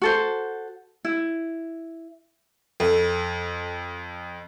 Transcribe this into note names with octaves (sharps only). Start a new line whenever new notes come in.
F#4 A4 C5
E4
F2 A4